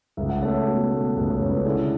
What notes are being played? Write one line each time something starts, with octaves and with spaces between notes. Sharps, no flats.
C#2 E5
F#5
A3 C#5 E5
B2
A3
C#2
C#5
C#2 B4
A4
D3 E4 G#4